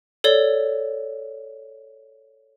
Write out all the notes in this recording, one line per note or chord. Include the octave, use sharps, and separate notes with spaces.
A4 C#5 D5 G7